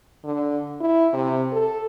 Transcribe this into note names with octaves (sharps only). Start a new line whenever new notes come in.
D3
E4
C3
A4